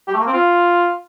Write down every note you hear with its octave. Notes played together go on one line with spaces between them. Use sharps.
G4
A3
A#3
C4
F4